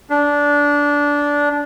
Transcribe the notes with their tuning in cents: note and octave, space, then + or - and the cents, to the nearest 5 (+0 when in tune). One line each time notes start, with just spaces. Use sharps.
D4 -15